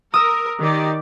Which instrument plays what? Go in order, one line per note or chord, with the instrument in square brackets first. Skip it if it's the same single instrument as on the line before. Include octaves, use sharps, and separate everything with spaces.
[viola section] A#4 [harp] D#6 E6
[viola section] D#3 G4 D5